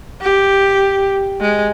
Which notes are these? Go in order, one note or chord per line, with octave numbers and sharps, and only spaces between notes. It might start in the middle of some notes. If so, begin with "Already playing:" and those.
G4
G#3